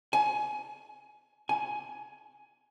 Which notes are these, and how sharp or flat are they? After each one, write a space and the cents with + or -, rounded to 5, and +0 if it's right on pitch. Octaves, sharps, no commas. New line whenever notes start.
G#5 +25
G#5 +15